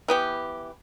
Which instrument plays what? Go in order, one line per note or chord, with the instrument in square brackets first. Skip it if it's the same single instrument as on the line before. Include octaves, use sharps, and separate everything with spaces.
[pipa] E3 B3 G4